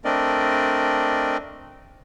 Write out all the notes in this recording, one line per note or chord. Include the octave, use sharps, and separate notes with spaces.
A3 C4 D4 A#4 D5 D#5